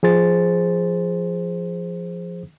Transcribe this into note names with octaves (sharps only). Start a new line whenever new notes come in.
F3 G#4 C5 A6